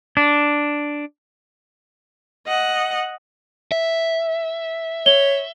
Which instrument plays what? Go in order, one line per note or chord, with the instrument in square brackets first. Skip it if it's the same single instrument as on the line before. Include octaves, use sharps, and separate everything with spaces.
[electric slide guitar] D4
[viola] D#5 F#5
[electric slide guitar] E5
[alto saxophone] C#5 [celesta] G7